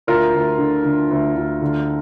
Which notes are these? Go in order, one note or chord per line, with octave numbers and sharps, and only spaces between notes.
D2 F4 A#4
D2
D3
D3
D2
D2
D3